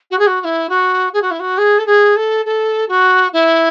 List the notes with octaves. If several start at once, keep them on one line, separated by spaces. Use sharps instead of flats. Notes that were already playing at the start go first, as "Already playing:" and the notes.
F#4
G#4
F#4
F#4
E4
F#4
G#4
F#4
E4
F#4
G#4
A4
G#4
A4
A4
F#4
E4